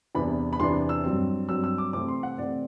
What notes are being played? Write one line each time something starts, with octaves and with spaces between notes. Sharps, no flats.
E2 C3 E3 B3 D4 B5
B5
E2 C3 E3 B3 D4 C6
E6
G2 F#3 C4
G2 F#3 C4 E6
E6
D6
C3 E3 A3 C4 D6
C6
F#5
C3 E3 A3 C4 D5